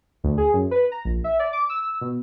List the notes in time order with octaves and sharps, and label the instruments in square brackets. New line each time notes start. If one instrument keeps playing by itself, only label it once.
[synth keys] D2
G#4
F#2
B4
A#5
A#1
E5
D5
D6
E6
B2